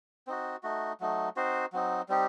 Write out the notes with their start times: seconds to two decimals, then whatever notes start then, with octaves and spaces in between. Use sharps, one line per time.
0.27 C4 D#4 F#4
0.63 A3 D#4 F#4
1.00 F#3 A3 D#4
1.36 C4 D#4 F#4 C5
1.72 F#3 C4 D#4
2.09 G3 C4 D#4 G4